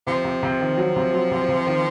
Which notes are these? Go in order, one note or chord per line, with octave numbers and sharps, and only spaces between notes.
C3 F3
C3
C3
D#3
F#3
C3
F#3
C3
C3
D#3